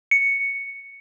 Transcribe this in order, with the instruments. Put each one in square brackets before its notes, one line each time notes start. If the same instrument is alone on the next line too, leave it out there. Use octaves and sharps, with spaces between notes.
[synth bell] C#7